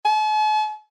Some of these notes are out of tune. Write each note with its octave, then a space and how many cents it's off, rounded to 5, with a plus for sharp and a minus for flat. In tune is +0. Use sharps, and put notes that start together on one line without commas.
A5 -45